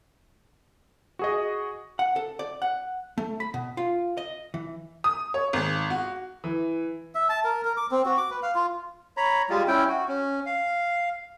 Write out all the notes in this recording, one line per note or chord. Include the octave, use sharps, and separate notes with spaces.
F#4 G#4 D#5
F#5
A4
D5
F#5
A3
B5
B2
F4
D#5
E3
D#6
C#5
G#1
F#4
E3
E5
A5
A#4
A#4
D6
C4
F#4
D6
B4
F5
F4
C#5 A#5 B5
G3 G#3 F4
C#4 E4 G5
F#4
C#4
F5